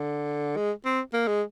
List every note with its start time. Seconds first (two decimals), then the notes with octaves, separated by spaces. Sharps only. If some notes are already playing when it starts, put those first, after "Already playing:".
Already playing: D3
0.57 G#3
0.85 C4
1.13 A#3
1.27 G#3